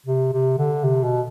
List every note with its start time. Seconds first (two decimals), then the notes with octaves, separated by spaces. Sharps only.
0.06 C3
0.33 C3
0.58 D3
0.84 C3
1.04 B2